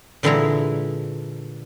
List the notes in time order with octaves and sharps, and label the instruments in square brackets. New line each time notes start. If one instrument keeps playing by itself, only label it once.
[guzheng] A#2 D3 E3 G#3 E4 A#5